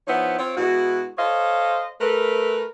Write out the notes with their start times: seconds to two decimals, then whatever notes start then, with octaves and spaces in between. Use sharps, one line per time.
0.08 F3 B3 D#4 E4 C5 C#5
0.39 C4 F4 C#5
0.57 B2 G#3 E4 F#4
1.18 A4 C5 C#5 D#5 F5
2.01 A3 A#4 B4